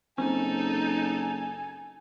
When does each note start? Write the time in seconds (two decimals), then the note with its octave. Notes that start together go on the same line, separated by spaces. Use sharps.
0.18 F#1 C4 D#4 A4 G#5